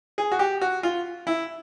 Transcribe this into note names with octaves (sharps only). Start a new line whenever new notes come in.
G#4
F#4
G4
F#4
F4
E4